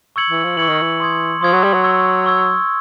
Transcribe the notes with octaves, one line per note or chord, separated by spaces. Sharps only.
C#6 E6 G#6 C#7 F#7
E3
F3
E3 C#6 E6 G#6 C#7 F#7
D#3
E3
C6 D#6 G#6
F3 C6 D#6 G#6
F#3
G3
F#3
C#6 E6 G#6
C#6 E6 G#6